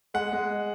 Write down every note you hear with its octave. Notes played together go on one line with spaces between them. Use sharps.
G#3 F#5
G#3